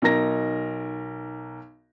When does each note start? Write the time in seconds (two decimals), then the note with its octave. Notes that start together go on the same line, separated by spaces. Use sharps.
0.02 B1 D#4 A#4 A#6